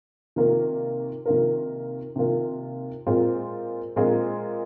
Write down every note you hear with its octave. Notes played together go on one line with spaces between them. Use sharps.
C3 D#3 A#3 F4 A#4
C3 D#3 A#3 F4 A#4
C3 D#3 A#3 F4 A#4
A#2 G#3 C4 F4
A#2 G#3 C4 F4